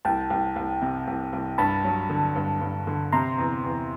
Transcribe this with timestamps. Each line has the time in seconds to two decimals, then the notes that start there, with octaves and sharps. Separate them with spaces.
0.05 C2 G5 A5
0.30 C2
0.56 C2
0.82 C3
1.07 C2
1.33 C2
1.58 G2 A5 B5
1.84 F#3
2.10 D3
2.36 G2
2.61 G2
2.87 D3
3.12 C3 A#5 C6
3.38 E2
3.64 E2